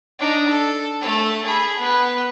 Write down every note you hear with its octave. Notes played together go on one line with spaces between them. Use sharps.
D4 D#4
A4
A3 A4
G#4 B5
B3 B4